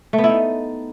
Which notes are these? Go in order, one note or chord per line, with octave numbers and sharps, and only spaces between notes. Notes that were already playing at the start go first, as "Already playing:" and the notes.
A3
B3
E4
D#4